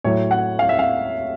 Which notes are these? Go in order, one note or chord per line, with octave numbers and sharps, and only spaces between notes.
A2 F#3 A3 C#5
F#5
F5
E5
F5